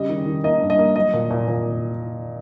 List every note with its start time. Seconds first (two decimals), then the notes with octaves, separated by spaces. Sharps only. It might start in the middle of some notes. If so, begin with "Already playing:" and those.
Already playing: C#3 G3 D#5
0.09 D#3
0.26 D#3
0.44 A#3 D#5
0.61 G2
0.70 D#5
0.79 A#3
0.96 F#3 D#5
1.13 A#2
1.30 A#2
1.48 A#2